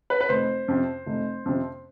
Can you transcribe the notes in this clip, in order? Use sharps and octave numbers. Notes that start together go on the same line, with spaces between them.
B4
B4
F1 C5
F2 C3
F1
F2 C3